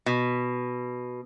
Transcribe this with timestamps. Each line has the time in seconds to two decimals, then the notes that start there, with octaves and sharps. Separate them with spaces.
0.06 B2